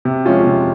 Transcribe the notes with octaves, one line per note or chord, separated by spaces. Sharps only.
C3
F3 G#3 C#4 F4
C3